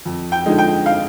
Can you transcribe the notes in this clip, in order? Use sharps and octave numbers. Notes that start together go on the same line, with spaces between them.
F2
G5
D3 F3 G#3 D#4
G5
F5